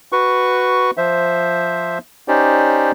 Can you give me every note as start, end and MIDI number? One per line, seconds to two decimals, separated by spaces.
0.12 0.91 66
0.12 0.91 71
0.12 0.91 85
0.97 1.98 53
0.97 1.98 72
0.97 1.98 76
2.28 2.92 61
2.28 2.92 63
2.28 2.92 67
2.28 2.92 72
2.28 2.92 74